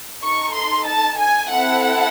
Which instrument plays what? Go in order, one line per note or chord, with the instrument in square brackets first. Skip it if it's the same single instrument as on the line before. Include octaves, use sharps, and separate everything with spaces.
[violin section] D#4 A4 C#6
C6
A5
G#5
C4 E4 A4 F#5